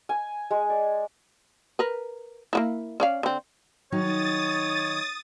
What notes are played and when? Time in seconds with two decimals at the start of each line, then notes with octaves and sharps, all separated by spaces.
0.09 G#5
0.51 G#3
0.70 D5
1.79 A#4 B4
2.53 A#3 B3 E4
3.00 C#4 D5 F5
3.23 D3 C4
3.92 D#3 F#3 D#4 C#5 D#6 A6